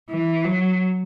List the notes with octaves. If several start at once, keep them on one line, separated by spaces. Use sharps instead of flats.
E3
F#3